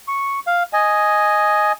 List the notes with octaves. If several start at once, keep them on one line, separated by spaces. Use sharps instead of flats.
C#6
F5
D#5 G#5